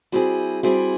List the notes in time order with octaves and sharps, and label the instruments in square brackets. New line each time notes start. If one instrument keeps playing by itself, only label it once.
[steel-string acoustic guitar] G3 C4 E4 G#4 [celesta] F#4
[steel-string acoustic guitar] G3 C4 E4 G#4 [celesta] F#4